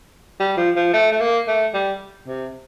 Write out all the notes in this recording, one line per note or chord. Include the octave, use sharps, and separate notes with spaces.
G3
F3
F3
A3
A3
A#3
A3
G3
C3